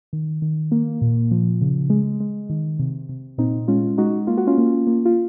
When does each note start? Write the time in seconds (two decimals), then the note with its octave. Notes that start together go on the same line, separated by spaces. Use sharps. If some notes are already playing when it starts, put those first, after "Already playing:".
0.13 D#3
0.42 D#3
0.72 A#3
1.01 A#2
1.31 F3
1.61 C#3
1.90 G#3
2.20 G#3
2.50 D#3
2.79 C3
3.09 C3
3.38 A#2 C4 D#4
3.68 G#3 C#4 F4
3.98 G#3 D#4 F#4
4.27 A#3 F4
4.38 F#4
4.47 C#4 F4
4.58 A#3
4.87 A#3
5.05 F4